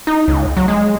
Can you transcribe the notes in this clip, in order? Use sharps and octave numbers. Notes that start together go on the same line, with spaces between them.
D#4
C#2
F#3
G#3